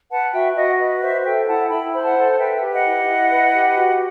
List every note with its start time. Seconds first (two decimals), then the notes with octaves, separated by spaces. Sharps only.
0.10 B4 F#5 A5
0.33 F#4 E5 G5
0.56 F#4 D#5 F#5
0.78 B4 D#5
1.02 C5 E5
1.25 A4 E5 G5
1.47 E4 F#5 A5
1.70 E4 G5 B5
1.93 C5 B5
2.04 F#5 A5
2.16 A4
2.31 F#5
2.38 B4 E5 G5
2.61 G4
2.73 D#5 F#5
2.84 E4
3.07 E4
3.30 B4
3.53 G4
3.76 F#4